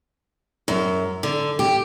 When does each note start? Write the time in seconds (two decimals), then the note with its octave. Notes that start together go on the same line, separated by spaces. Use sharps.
0.68 F#2
1.23 D3
1.59 G4